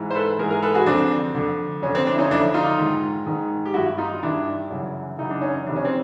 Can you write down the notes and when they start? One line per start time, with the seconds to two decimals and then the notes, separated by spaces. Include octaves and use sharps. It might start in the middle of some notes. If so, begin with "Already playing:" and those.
Already playing: G#2 E3
0.10 C5
0.15 A4 B4
0.39 G#2 E3 G#4 A#4
0.50 G#4 A#4
0.62 A4 B4
0.74 F#4 G#4
0.86 F2 D3 C4 D4
1.35 F2 D3
1.82 F2 C#4
1.86 D3
1.95 C4
2.07 C4 D4
2.13 E4
2.18 C#4 D#4
2.31 F2 D3 D4 E4
2.54 D#4 F4
2.78 G#2 D#3
3.26 G#2 D#3
3.65 G4
3.74 G2 D#3 E4 F#4
3.98 D#4 F4
4.22 G2 D#3 D4 E4
4.70 F#2 C#3 E3
5.18 F#2 C#3 E3 D#4
5.30 D4
5.41 C#4 D#4
5.66 F2 C3 D#3 D4
5.76 C#4
5.85 C4